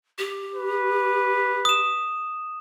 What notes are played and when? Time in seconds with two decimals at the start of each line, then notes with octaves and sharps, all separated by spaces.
0.18 G4
0.55 B4
1.65 D#6 E7